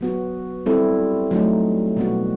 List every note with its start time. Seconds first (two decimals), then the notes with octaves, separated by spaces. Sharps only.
0.01 F#3 B3 F#4
0.66 G3 C4 E4 A4
1.31 F#3 A3 D#4
1.97 B2 G3 B3 F#4